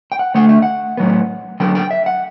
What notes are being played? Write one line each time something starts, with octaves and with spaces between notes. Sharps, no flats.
G5
F#5
D3 A3 F#5
E5
F#5
A2 F#3 B3
D3 F#3 B3 G5
G5
E5
F#5